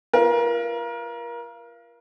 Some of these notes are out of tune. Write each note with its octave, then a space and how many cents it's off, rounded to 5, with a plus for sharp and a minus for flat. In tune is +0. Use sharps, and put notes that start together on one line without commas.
F4 -30 A#4 +30